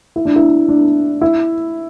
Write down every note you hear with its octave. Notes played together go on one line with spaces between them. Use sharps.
E4
D4
E4
D4
E4